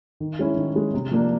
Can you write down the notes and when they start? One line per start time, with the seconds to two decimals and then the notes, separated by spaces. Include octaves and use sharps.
0.20 D#3
0.39 G#3 C#4 E4
0.57 D#3
0.75 G#3 C#4 E4
0.94 C3
1.11 F3 A#3 D4